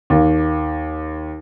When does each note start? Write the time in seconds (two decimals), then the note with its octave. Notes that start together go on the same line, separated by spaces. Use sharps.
0.10 D#2